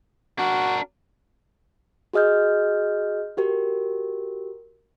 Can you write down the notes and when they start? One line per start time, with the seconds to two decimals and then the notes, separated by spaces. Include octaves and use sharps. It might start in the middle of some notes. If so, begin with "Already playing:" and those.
0.39 D4 F#4 A#4
2.13 F#4 G#4 D#5 F6 G6
3.37 F#4 G4 A#4